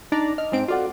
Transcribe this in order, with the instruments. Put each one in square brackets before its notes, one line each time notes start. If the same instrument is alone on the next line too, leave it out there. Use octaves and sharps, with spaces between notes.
[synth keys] D4 D5 A#5 [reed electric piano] D#4
[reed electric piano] D#5 [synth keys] F6
[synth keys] G#2 C4 D7
[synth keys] F4 D5 [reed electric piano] F#4 A4 F#5